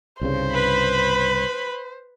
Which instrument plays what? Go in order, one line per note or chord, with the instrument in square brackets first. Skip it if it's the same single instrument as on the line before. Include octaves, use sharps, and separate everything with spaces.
[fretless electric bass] C2 G2 C#3 [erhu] C5
[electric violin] B4 B5